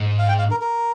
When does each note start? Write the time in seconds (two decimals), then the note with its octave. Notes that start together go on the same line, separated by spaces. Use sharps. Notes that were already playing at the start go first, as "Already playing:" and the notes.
Already playing: G#2
0.19 F5
0.28 G5
0.39 F5
0.51 A#4
0.61 A#4